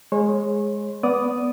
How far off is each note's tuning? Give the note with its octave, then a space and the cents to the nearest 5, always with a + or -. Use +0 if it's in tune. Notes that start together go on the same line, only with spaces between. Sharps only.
G#3 +0 C#5 -35
B3 +0 D5 -15 D#6 +0